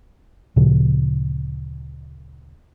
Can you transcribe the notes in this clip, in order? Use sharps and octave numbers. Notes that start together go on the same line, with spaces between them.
D2 A#2 C#3 F3